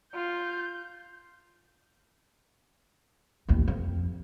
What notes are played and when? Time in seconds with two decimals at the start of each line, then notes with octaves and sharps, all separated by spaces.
0.14 F4 G6
3.49 A1 D#2
3.68 F2